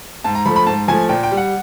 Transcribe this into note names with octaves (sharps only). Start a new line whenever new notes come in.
G#2 A5
A#5
F3 A3 B5
B5
G#2 A5
F3 A3 G#5
A#2 G5
G5
G3
F#5